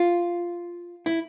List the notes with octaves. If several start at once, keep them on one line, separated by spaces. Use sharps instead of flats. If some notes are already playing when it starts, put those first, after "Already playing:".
Already playing: F4
E4